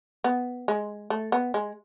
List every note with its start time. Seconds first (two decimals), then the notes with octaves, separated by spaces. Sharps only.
0.24 B3
0.68 G#3
1.10 A3
1.32 B3
1.54 G#3